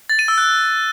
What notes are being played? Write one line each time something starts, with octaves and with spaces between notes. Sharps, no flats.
A6
D#7
E6
F#6